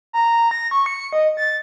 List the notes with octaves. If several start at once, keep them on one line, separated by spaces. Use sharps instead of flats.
A#5
A#6
C#6
C#7
D#5
A6